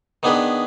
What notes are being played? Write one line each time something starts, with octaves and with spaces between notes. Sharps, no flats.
D#3 B3 D4 G#4 B4